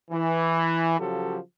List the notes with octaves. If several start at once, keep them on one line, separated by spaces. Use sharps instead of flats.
E3
C#3 F3 F#3 G4 A4